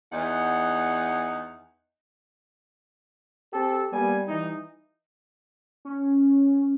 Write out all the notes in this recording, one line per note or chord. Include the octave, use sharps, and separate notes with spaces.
E2 D#4 F#5
C4 G4 A4
G3 A#3 B3 G#5
E3 G3 D#4
C#4